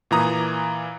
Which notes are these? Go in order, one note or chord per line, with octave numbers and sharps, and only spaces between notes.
A#2 E3 A#5 D#6